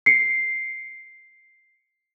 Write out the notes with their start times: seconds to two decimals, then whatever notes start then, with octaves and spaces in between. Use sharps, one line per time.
0.06 C7 C#7